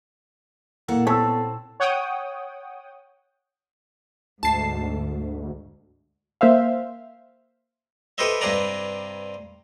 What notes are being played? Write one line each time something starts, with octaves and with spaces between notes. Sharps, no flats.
A#2 A#3 E4 A4 F#5
B3 C4 A4 C#5 A5 E6
C#5 F#5 G5 D#6
D2 G#2 A5 C7
A#3 C5 E5 F5
G4 A4 B4 C5 D#5 E5
G2 C3 C4 B4 D5 A#5